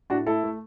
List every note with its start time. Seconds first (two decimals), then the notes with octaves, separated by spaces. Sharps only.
0.10 A2 D4 F#4
0.26 A3 E4 A4
0.44 A3